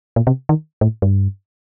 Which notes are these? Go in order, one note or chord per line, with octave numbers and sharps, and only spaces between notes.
A#2
C3
D#3
A2
G2